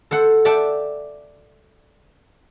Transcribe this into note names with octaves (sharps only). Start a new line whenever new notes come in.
A4 C5 F#5
D5 E5 F#5 G5 A5